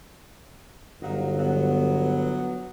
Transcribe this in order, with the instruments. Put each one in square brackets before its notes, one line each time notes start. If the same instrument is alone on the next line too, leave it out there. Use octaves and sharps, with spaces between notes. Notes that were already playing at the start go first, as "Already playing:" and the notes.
[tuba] G1 [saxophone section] F#3 D#4 F5
[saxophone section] F#3 B3